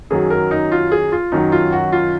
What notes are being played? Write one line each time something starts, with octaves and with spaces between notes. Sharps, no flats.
F#2 D#3 F#3 G#4
A#4
D#4
F4
G#4
F4
F#2 D#3 F#3 D#4
F4
F#4
F4